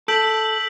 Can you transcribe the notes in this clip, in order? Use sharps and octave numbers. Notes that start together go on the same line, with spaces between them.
A4 E6 G6 B6 D7 F#7